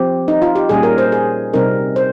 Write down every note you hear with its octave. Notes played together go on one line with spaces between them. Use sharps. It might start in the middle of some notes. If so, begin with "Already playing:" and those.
Already playing: F3 C4 G4
D#4
F4
G4
A#2 G3 C#4 G#4
A#4
C5
G#4
C3 G3 C4 D#4 A#4
C5